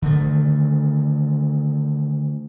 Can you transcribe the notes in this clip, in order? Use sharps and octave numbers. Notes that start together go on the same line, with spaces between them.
D3 D#3 A3